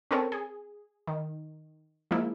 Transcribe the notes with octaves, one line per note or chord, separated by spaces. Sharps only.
C4 C#4 A4 A#4 C#5
G#4
D#3
F3 G#3 A#3 E4